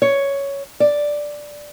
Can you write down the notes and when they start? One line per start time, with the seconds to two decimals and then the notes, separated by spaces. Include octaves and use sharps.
0.02 C#5
0.80 D5